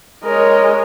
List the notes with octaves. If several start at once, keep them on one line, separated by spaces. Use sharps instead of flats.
G#3 A#4 C#5 D#5